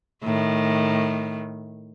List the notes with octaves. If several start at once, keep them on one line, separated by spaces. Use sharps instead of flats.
A2 D#3